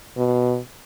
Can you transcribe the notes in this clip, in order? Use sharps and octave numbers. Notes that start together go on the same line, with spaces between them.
B2